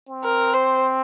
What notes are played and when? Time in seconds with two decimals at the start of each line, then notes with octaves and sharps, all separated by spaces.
0.09 C4
0.24 A#4
0.54 C5